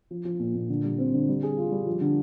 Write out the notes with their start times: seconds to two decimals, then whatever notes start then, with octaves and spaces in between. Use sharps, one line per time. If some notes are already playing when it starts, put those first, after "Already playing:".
0.11 F3
0.25 F3
0.39 A#2
0.55 A#2
0.69 D3
0.83 G3
0.98 C4
1.14 D3
1.28 G3
1.43 G#4
1.57 F4
1.72 G3
1.86 F3
2.01 D3